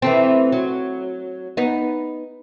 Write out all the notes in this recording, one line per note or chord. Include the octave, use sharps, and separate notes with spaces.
E3 A3 C4
F#3
B3 D#4